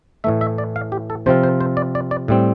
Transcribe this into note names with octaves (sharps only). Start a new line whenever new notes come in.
A2 E3 A3 E5
E5
D5
F5
G4
A4
C3 F3 C4 F4 C5
C5
C5
D5
D5
D5
A2 G3 C4